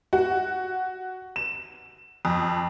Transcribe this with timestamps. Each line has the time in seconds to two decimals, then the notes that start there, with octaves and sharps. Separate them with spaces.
0.13 F#4
1.36 E7
2.25 F2